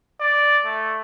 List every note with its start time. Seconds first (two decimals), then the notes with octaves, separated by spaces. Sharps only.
0.21 D5
0.66 A3